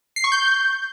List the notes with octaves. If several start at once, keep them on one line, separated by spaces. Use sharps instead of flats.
C7
C#6
G6